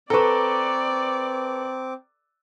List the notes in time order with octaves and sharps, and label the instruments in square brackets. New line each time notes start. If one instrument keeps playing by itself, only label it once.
[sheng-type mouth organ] C4 D6 [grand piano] A4 B4 [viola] D5 [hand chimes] A#5 C#6